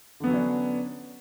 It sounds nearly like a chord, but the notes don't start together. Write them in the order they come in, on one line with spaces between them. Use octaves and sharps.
D3 B3 F#3 C#4 D4